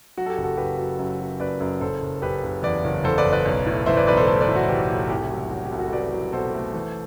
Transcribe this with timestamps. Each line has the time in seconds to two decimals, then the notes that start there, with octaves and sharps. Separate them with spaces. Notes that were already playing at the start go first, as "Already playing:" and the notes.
0.17 F#3 F#4
0.26 A4
0.30 G4
0.37 F#1
0.44 F#4 A4
0.57 F#1 G4 B4
0.79 F#3
0.99 F#2
1.19 F#3
1.40 F#2 B4 D5
1.60 F#2
1.81 F#1 A4 C5
2.02 F#1
2.22 F#1 G4 B4
2.43 F#1
2.63 E2 B4 D5
2.84 F#1
3.04 E2 A4 C5
3.18 B4 D5
3.25 F#1
3.33 B4 D5
3.45 B1
3.66 A2
3.86 E3 C5 E5
3.97 B4 D5
4.07 B1 B4 D5
4.17 A4 C5
4.27 A3 A4 C5
4.41 B4 D5
4.48 A2
4.56 F#4
4.68 E3 G4
4.90 A2
5.10 C2 G4
5.30 F#3
5.51 F#3 F#4
5.65 G4
5.72 C2
5.78 F#4 A4
5.92 F#3 B4 D5
6.13 F#3
6.33 B2 A4 C5
6.54 A3
6.74 E3